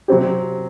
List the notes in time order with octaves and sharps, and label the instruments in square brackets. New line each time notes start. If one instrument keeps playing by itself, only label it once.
[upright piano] C3 F#3 C4 G4